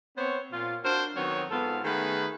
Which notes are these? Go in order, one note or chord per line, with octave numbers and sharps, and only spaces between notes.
B3 C4 C5 C#5
A#2 F4
D4 F#4 A#4 C5
D#3 F#3 B3 C4 C#5
G#2 B3 F4 A4 F5
D#3 A3 B3 G#4 B4